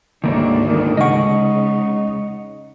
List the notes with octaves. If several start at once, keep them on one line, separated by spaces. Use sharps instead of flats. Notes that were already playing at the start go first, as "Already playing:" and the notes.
D2 G#2 D#3 A#3 D4 C#5
A#2 D#3
C#3 G#3 D#4 D#5 F#5 C#6